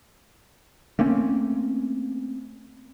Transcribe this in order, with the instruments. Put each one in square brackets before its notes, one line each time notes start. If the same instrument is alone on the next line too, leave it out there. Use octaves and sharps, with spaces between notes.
[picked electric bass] A3 A#3 C4 C#4